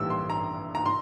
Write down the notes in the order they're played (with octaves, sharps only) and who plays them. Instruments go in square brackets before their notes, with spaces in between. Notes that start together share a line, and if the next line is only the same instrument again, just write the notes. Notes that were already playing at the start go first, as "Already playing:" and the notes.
Already playing: [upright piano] A#1 A2 E3 G3 A#3 E6
C6
A#5
A#5
C6